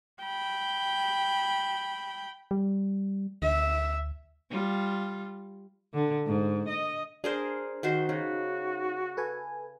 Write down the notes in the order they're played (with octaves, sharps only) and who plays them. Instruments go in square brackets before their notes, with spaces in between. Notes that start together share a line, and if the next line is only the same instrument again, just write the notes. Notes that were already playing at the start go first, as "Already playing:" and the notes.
[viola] G5 B5
[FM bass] G3
[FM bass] D2 [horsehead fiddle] E5
[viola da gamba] G3 F4
D3
G#2
D#5
[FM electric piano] D4 [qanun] G#4 A#4 C5
[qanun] D#3 F#4 C5
[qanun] C#3 [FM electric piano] D#4 [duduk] F#4
[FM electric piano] A4 B4 G#5